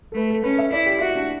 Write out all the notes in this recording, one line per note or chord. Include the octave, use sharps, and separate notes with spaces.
A4
A3 B4
A4
C#4 B4
E5
E4 D5
G4
E4 F#4
D4